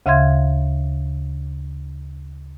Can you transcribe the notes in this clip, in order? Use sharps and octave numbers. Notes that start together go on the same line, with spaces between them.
D2 C#3 E5 F5 C6 G#6